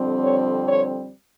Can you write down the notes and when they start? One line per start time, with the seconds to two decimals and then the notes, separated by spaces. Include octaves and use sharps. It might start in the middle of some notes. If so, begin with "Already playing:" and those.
Already playing: F2 D3 G3 C4
0.22 C#5
0.67 C#5